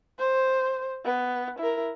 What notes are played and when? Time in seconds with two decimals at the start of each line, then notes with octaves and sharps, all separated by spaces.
0.19 C5
1.05 B3
1.59 E4 A#4